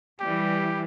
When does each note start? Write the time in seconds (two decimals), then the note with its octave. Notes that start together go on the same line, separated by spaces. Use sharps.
0.20 E3 G3 G4